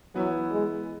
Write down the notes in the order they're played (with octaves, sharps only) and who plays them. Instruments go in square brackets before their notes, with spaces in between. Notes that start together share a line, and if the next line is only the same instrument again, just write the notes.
[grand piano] E3 B3 E4 [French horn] F#3
[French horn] G#3